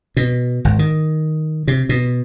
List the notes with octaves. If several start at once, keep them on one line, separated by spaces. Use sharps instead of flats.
B2
G#1
D#3
C3
B2